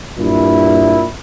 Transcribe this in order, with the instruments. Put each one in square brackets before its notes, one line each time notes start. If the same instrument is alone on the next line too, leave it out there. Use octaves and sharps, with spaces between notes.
[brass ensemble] G2 A#2 E4